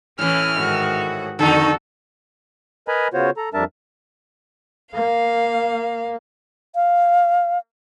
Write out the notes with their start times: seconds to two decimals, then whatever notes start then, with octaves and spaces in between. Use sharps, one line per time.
0.19 A2 E3 C#4 F6
0.56 G#2 D#3 F#4
1.39 F2 D3 D#3 D#4 F#4 A4
2.88 A#4 B4 D#5 G#5 A#5 B5
3.14 C#3 B3 F4 F#4 C5 C#5
3.37 A4 A#5
3.54 F2 G3 D4 A#4 E5 A5
4.94 A#3 F5
6.75 F5